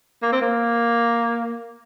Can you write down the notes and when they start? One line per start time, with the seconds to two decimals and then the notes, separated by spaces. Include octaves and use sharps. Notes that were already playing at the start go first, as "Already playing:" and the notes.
0.23 A#3
0.33 C4
0.42 A#3